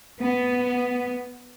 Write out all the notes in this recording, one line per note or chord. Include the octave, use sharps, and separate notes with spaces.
B3